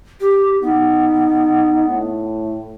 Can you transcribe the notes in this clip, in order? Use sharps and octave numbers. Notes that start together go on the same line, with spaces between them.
G4
B3 D#4
A2